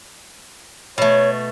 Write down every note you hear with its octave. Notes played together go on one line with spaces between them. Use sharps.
B2 A3 C#5